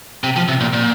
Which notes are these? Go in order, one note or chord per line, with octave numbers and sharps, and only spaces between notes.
C3
F3
C3
A#2
A#2